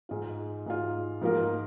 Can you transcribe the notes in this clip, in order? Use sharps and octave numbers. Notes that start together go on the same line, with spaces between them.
G#2 G#3 F4
G#2 G#3 F4
G#2 F3 A#3 F4 A#4